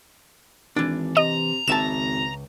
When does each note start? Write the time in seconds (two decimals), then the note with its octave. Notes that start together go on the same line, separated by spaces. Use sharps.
0.76 G#1 E3 D4
1.17 C3 D#5 A#5
1.67 G#1 C#2 E5 A5 E7